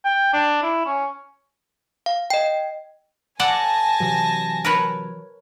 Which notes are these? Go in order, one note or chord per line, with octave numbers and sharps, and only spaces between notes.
G5
D4
E4
C#4
F5
D#5 G5
A4 D5 F#5 G#5 A5 A#6
C3 E3 F#3
A#4 B4 C#5